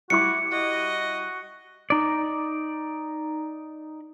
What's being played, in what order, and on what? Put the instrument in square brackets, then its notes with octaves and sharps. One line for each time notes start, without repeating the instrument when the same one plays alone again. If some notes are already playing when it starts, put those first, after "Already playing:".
[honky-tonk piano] G3 E4 D6 [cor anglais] F#4 [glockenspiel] C#7
[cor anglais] F#4 [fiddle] D#5
[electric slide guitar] D#4 D5